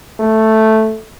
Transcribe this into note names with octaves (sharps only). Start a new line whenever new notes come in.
A3